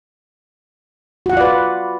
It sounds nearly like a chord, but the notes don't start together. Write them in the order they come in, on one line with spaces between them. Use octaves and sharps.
F#4 F#5 F4 D5 B4